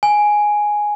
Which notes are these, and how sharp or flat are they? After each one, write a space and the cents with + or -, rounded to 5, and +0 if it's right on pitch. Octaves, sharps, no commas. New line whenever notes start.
G#5 +0